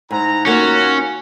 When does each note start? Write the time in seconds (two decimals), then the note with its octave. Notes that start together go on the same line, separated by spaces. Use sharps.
0.11 G#2 E4 F#5 A#5
0.46 D#3 A#3 C#4 F4 F#4